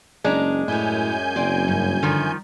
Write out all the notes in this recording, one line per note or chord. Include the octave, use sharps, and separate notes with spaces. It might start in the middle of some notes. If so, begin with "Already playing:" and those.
F#1 G#3 C#4 D4 A#5
F#2 A2 E4 C#5 G#5 G6
F#1 C4 D5
G2
D3 D#3 F3